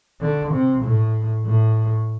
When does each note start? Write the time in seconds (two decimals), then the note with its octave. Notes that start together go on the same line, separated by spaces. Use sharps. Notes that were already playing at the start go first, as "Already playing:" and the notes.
0.20 D3
0.52 C3
0.82 A2
1.45 A2